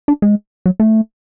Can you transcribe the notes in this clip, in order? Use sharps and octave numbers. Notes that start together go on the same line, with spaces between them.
D4
G#3
F#3
A3